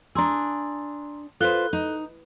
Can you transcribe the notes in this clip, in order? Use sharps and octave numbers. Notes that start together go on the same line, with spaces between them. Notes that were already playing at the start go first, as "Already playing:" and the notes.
D4 G#4 A#5 C6 E6
F4 A4 B4 C5 F#6 G7
D#4